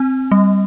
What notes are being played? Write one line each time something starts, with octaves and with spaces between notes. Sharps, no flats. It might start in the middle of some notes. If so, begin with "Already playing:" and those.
Already playing: C4
G3